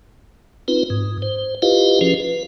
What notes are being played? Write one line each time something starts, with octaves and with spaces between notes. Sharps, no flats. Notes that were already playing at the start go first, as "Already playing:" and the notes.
C4 D#4 F4 B4
G#2
C5
E4 F4 G4 B4 D#5 F5
F3 C#4 F4 G#4 B4
B4